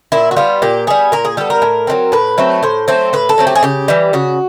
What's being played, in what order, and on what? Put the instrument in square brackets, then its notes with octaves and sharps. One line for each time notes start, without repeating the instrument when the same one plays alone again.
[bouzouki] A#2 E4
F#4
G3 B3 F4
A#2 G4
G3 B3 G#4
A#2 A#4
G#4
G3 B3 A4
A#4
A2
F#3 A3 C4
A2 B4
F#3 A3 C4
A2 C5
F#3 A3 C4 C5
A2 B4
A4
F#3 A3 C4
G4
G#4
C#3 G4
E3 G3
C#3 F#4